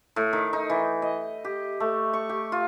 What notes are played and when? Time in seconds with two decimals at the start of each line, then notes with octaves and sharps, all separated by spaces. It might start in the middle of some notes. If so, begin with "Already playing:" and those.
0.16 A2
0.33 D#3
0.53 D#4
0.70 E3
1.02 D#5
1.45 G4
1.80 A3
2.13 C#6
2.29 G4
2.52 F4